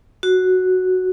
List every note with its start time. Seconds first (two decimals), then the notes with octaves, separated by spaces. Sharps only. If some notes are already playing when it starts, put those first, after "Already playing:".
0.23 F#4